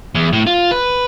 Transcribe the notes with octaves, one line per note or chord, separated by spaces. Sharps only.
E2
A2
F4
B4